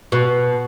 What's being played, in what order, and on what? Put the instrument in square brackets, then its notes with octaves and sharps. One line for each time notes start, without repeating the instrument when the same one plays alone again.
[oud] B2